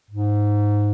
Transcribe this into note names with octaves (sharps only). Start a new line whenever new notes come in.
G#2